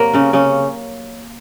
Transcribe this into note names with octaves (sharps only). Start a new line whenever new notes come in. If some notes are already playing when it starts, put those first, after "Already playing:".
Already playing: C3 F#3 A#3 A#4 C#5
C#3 C#4
C#3 C#4